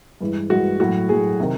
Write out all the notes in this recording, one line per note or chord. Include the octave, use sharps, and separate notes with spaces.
G2 E3 G#3
G2 E3 G#3 F#4
A2 F#3 A3 F#4
A2 F#3 A3 G#4
C3 D#3